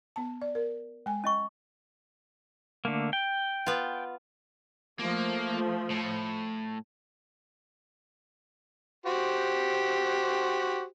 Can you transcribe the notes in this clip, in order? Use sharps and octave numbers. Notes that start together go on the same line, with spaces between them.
B3 A5
D5
A#4
G#3 G#5
C#4 D#5 C#6
D3 A3 A#3
G5
B3 F4
F3 A3 A#3
A2
F#4 G4 C5